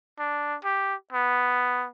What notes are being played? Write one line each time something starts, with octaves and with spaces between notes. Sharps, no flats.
D4
G4
B3